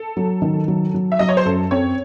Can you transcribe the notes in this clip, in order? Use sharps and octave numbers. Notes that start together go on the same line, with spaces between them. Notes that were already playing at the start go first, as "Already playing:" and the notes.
Already playing: A4
F#3
D#3
F#3
F#3
E5
F#3 D#5
C#5
C5
F#2 A4
C4 C#5